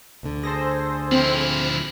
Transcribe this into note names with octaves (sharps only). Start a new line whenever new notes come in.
D2 D3
G#4 A4 C5 A#6
F3 C4 E4